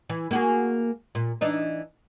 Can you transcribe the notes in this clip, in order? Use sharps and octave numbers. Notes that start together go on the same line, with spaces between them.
E3
A#3 F#4 G#4
A#2
E3 D4 D#4